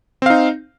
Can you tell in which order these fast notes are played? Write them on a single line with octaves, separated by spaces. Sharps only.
C4 F5 D#4